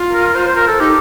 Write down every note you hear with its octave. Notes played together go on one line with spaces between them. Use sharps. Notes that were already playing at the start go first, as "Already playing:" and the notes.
Already playing: F4
A#4
C5
C5
A#4
A4
D#4 G4